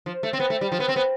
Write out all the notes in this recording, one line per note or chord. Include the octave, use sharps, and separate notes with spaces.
F3
A3
C4
B3
A3
G3
F3
B3
C4
B3